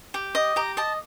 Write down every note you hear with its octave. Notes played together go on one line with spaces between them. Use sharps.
G4
D#5
G4 A#5
D#5 A5